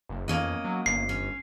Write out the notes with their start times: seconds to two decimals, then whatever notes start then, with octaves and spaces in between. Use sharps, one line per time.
0.09 F#1
0.28 F2 A#3 C#4 D#5
0.64 F#3
0.86 G1 C7
1.09 C#4